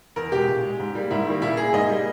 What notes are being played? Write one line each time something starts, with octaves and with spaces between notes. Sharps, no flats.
E2 A#4
B2 G#3 G4
A#2
G#3
G#2
G3 A#3
G#2 E4
D#3 G3 A#3
A#2 E4
A#3 G#4
G#2 D#5
G3 A#3